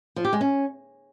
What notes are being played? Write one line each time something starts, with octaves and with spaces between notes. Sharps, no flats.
F3
G4
G#3
C#4